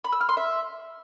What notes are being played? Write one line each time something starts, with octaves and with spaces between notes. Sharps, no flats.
B5
E6
F6
C6
E5